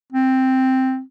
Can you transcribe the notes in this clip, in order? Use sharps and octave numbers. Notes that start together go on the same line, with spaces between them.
C4